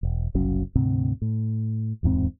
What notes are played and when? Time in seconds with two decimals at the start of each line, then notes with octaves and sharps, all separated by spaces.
0.03 E1
0.35 F#1 C2 F#3 C#4
0.75 D2 G#2 C3 C4
1.22 A2
2.03 D1 E2 G#2 C4